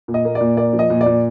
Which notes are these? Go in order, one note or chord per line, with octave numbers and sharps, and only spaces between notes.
A#2
D#5
A#3
D5
A#2
A#3 D5
F3
D#5
A#2
D5
A#2